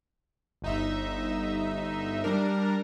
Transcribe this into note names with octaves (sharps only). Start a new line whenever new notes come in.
G1 D#4 E5
G3 D4 A#4